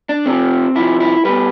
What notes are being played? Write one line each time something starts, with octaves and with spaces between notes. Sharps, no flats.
D4
C3 F3 C4
C3 F3 E4
E4
B2 G3 B4